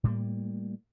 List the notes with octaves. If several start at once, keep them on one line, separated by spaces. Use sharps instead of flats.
A2 G3 A#3